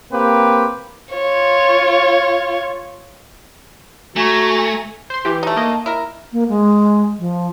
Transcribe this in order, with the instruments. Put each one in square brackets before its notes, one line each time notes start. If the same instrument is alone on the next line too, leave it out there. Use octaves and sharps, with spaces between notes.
[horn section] A#3 C4 G4 B4
[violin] F4 C#5
[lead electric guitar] A3 [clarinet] F#4 [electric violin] G#5 A#5
[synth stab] C5 C6
E3 G4
[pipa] A3 D#4
[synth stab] A#3 D#5
[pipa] E4 A#4
[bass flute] A#3
G#3
F3